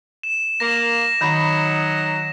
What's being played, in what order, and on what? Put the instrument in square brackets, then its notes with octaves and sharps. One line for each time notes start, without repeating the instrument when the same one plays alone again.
[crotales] E7
[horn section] A#3 [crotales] A#6 E7
[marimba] D#3 B5 [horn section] F#3 D#4